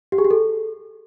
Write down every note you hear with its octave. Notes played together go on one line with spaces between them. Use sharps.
G4
G#4
G4
A4